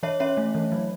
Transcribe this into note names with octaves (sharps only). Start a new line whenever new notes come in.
E3 C#5 E5
C#4 C#5 E5
A3
E3
F#3